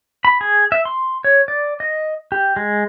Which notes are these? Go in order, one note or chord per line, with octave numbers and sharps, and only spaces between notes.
B5
G#4
E5
C6
C#5
D5
D#5
G4
G#3